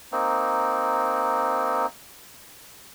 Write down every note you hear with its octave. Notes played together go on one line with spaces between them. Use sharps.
A#3 C4 D#4